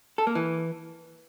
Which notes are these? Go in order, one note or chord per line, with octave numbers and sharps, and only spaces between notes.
A4
A#3
E3